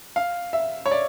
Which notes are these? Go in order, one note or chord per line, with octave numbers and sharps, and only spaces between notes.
F5
E5
C#5
D5